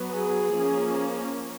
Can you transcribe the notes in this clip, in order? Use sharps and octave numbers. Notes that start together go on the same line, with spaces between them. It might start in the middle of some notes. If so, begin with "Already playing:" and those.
Already playing: F#3 B3
G#4
F3 A#3 C#4